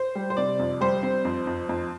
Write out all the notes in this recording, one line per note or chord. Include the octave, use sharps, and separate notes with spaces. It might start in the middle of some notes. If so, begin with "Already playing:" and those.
Already playing: C5
G3
C5
C3 D5
F2
G3 C5
C4
F2
F2
F2